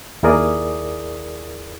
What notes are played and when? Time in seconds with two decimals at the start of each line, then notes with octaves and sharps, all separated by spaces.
0.23 D#2 E4 G#4 A#4 D5 D#6